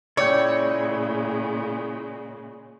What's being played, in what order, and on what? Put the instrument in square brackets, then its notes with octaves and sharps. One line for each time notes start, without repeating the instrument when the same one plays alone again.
[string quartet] A#2 C#3 G#3 [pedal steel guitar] E4 G5 [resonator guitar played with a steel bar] C#5 [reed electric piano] D5